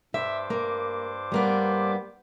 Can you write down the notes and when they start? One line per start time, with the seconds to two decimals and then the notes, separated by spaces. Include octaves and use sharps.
0.14 G2 C5 E5 D6
0.50 A#3
1.32 G3 A#3 B3